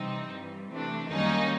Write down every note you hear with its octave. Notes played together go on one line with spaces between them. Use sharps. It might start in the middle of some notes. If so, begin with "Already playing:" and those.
Already playing: C3 E3 G3 C4 D#4
G2 E3 G3
C3 E3 A3 D4
F#2 D#3 G3 A#3 C#4 D#4